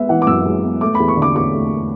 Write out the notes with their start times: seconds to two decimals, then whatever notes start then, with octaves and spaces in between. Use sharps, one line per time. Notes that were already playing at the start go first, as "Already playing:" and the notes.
Already playing: G#3 B3 E5
0.09 E3 F#5
0.22 D6
0.27 F#2 E6
0.46 G#3
0.63 B3
0.81 A3 D6
0.95 E2 B5
1.08 C#6
1.17 D3
1.22 D6
1.36 E2 D6
1.54 A3